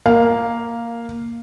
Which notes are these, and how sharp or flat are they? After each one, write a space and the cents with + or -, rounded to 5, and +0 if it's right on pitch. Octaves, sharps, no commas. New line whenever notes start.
A#3 +0 F5 +0